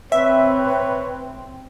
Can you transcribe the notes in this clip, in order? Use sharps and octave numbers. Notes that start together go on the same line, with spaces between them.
C4 B4 C#5 E5